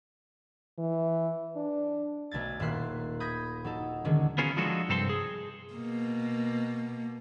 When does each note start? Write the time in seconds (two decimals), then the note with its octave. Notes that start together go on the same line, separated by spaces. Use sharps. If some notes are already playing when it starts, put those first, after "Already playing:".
0.78 E3
1.56 D4
2.31 B1 A3 G#6 A6
2.60 D#1 A#3 E5 C6 F#6
3.20 B5 D#6 G6 G#6 A#6
3.64 F#3 D#4 A4
4.05 D3 D#3 F#3 G#3 C#4
4.38 B3 C#4 F4 F#4 G#4 A#4
4.57 F3 G#3 D4 D#4 F#4 A4
4.89 C2 G2 C4 A4 A#5 C6
5.09 G#4
5.74 B2 A#3